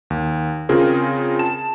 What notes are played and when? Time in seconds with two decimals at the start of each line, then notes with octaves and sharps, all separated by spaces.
0.10 D#2
0.69 C#3 C4 F4 G#4 A#4
1.39 A5 E7